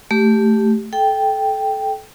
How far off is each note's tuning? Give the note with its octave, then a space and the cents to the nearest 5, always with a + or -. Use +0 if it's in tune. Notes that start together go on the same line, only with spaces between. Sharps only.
A3 +0 G4 +0
A4 -25 G5 +0